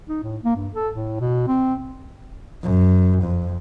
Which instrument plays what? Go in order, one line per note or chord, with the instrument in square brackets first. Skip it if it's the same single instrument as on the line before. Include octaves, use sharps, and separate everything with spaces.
[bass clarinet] D#4
A2
A#3
G2
A4
A2
B2
C4
[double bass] F#2
F2